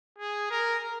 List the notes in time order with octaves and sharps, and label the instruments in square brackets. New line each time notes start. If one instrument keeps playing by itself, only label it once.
[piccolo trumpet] G#4
A#4